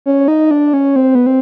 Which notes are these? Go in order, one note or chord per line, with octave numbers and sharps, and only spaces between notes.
C#4
D#4
D4
C#4
C4
B3
C4